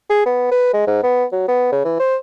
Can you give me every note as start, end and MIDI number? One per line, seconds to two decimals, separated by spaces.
0.10 0.25 68
0.26 0.49 59
0.51 0.73 71
0.74 0.85 56
0.87 1.01 44
1.03 1.24 59
1.32 1.45 54
1.48 1.71 59
1.72 1.84 49
1.85 1.99 52
1.99 2.16 72